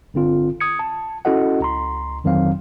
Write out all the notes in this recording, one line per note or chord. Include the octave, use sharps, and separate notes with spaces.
G1 D3 C4 F4
D#6 G#6 C#7
A5
C#4 E4 F#4 A4 D#5 F#5
C#2 A#5 C6
G1 F2 D#3 F#3 C4 F5